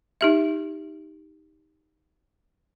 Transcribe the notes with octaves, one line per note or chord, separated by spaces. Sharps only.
D#4 G4 E5